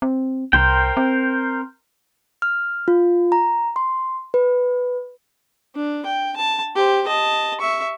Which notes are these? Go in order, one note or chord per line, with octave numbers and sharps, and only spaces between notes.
C4
C2 A#4 C5 G5
C4
F6
F4
A#5
C6
B4
D4
G5
A5
G4 C5
D#5 A5
E5 C#6